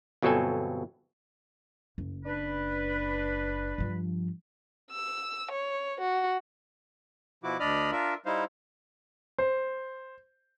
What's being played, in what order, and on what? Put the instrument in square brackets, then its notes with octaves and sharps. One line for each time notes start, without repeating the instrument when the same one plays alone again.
[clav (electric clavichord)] G1 B2 F#3 C4 A4 G#5
[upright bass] F#1
[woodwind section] D4 B4
[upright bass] G2 F3
[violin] E6
C#5
F#4
[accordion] B2 F3 E4 F#4 D6
D2 D4 D5 D#5 B5 F6
D4 F4 A#4 E5
G3 D#4 E4 C5 F5
[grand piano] C5